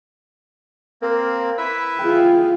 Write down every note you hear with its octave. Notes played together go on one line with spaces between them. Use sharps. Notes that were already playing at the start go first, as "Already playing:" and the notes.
A#3 C4 A#4
E4 B4 E5 B6
F4 G#4 G5